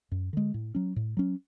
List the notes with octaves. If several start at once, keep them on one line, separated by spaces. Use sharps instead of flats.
F#2
D3 G#3
A2
F#3 C#4
A2
F#3 C#4